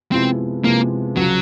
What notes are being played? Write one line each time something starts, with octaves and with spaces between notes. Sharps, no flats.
C3 F3 G#3 B3 C4 E4
C3 F3 G#3 A#3 B3 E4
C#2 C#3 F3 F#3